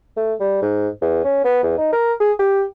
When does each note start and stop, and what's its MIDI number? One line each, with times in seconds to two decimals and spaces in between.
0.17 0.34 57
0.40 0.59 55
0.62 0.89 44
1.02 1.24 40
1.24 1.44 61
1.45 1.60 59
1.63 1.77 40
1.78 1.90 63
1.92 2.13 70
2.20 2.32 68
2.39 2.64 67